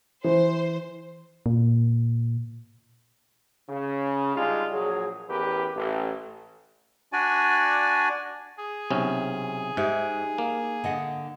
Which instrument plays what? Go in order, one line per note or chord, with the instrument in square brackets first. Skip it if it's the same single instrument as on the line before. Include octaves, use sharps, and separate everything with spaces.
[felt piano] E3 [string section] C5
[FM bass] A#2
[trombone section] C#3
G3 G#3 D4 D#4 F4
A#1 F#3 G#4
A1 E2 G4 A#4 B4
A1
[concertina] D4 F#4 D5 G#5
[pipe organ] G#4
[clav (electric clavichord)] B1 C3 C#4
[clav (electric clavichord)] G#2 [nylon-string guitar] D#4 G4 E5
[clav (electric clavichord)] A#3
[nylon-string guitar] D3 D#5 F#5